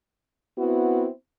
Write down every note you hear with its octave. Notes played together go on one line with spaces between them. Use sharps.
B3 C4 E4 F#4